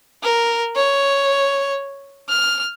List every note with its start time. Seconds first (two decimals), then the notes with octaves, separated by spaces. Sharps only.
0.23 A#4
0.75 C#5
2.29 F6